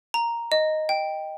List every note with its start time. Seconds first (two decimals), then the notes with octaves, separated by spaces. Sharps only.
0.14 A#5
0.52 D#5
0.89 G5